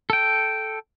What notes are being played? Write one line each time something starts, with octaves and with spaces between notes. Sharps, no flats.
A4 G5